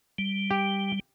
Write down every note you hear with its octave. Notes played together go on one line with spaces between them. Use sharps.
G3
G4